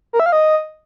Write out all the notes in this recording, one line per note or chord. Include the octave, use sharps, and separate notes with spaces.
A#4
E5
F5
D#5